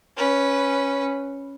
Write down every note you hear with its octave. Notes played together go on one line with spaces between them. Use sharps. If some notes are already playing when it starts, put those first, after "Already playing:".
C#4 B4